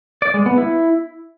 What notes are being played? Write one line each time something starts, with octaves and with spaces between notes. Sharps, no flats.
D5
G#3
B3
E4